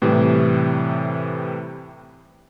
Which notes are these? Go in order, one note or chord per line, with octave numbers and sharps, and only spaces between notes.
A2 C3 E3 G3